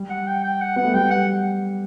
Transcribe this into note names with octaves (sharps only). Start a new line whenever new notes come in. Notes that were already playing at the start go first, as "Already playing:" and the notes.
Already playing: G3
F#5
G5
G5
F#5
B3 F#5
A3
G3 G5
F#5